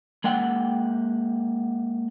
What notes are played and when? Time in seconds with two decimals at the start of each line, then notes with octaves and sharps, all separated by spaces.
0.24 G#3 A#3 F#5 G5